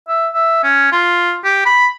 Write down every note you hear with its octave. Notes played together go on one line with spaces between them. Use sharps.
E5
E5
C#4
F4
G4
B5